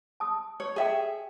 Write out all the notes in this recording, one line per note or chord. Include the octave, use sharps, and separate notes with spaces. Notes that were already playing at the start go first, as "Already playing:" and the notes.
A5 D#6
C#5
G#4 A4 D5 E5 G5